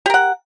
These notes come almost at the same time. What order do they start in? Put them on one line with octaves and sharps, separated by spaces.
G4 A#4 F#5